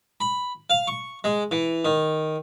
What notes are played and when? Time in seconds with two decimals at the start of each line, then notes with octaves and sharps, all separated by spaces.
0.21 B5
0.70 F5
0.87 C#6
1.24 G#3
1.51 E3
1.85 D#3